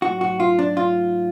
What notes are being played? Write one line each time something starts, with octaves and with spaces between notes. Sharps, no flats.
G#2 F#3 A3 F#4
F#4
F4
D4
F4